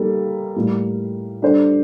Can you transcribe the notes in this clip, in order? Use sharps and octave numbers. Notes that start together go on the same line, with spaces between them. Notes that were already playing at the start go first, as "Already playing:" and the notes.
Already playing: G3 A#3 D#4 A4
A2 G3 A#3 F4
G3 D4 A4 C5